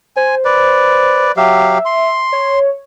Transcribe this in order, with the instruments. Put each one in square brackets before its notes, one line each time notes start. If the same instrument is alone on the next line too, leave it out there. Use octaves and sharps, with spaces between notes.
[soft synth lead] C5 [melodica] G#5
[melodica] B4 D5
[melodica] F#3 G4 F5 [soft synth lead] E5
[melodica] C6
[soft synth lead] C#5